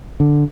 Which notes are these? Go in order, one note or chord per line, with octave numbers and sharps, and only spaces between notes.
D3